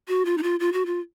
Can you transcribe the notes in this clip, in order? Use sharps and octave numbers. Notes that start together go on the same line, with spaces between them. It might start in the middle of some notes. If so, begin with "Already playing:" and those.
F#4
F4
D#4
F4
F4
F#4
F4